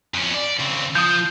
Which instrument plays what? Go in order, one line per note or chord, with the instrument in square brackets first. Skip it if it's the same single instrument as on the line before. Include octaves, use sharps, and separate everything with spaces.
[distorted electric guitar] F2 C#4
D5
C#3 C4
[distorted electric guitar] F3 [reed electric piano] D#6 G6